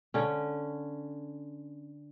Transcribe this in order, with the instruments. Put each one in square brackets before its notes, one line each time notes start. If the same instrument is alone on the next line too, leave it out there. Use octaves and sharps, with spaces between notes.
[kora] D3 C#4